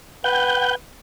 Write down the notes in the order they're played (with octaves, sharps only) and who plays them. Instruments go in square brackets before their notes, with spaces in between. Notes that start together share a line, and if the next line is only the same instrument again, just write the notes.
[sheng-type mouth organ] B4 [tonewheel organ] F#5 G5 G6